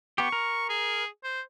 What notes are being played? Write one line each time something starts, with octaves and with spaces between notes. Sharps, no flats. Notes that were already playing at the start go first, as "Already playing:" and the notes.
B3 G4 C#6
A#4
G#4
C5